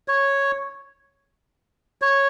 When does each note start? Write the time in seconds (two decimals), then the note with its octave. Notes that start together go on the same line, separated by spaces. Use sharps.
0.08 C#5
2.02 C#5